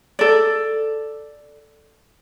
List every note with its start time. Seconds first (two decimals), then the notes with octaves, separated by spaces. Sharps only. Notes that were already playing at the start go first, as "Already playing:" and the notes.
0.19 A4 D5